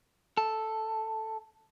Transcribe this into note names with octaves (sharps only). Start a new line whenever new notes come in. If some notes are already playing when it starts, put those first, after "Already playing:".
A4